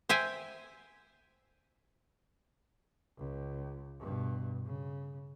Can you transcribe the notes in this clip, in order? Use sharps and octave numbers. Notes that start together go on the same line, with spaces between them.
C5 E5 G5 G#5
C#2
G2 B2
C#3